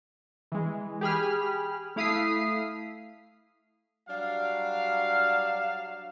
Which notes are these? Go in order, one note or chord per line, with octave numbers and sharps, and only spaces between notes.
E3 G#3
G4 G#4 B5 F6
A3 E4 F5 D#6 B6 C7
F#3 G3 D4 F5